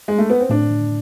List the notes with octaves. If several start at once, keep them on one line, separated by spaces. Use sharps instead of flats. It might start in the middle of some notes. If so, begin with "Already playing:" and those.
G#3
A3
B3
C4
A2 D4